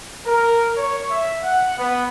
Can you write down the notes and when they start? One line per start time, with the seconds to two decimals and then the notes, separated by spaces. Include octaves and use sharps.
0.25 A#4
0.77 C#5
1.10 E5
1.42 F#5
1.78 B3